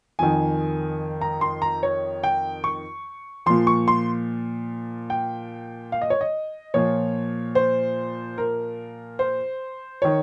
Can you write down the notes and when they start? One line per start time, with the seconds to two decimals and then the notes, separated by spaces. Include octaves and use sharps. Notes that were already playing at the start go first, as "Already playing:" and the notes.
0.19 F2 D#3 G#5
1.21 A#5
1.41 C6
1.62 A#5
1.83 C#5
2.24 G5
2.64 C#6
3.46 A#2 F3 C6
3.67 C#6
3.88 C6
5.10 G5
5.92 F5
6.01 D#5
6.10 C#5
6.21 D#5
6.74 A#2 F3 C#5
7.55 C5
8.38 A#4
9.19 C5
10.02 D#3 C#5